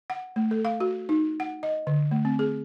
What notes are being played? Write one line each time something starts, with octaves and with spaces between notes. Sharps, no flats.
F#5
A3
A4
F5
F#4
D#4
F#5
D#5
D3
A3
C4
G#4